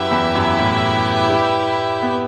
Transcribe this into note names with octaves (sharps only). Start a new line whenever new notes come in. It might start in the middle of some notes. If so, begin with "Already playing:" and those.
Already playing: F#2 E4 G4 B4 E5
E2
F#2
A2
G3
B3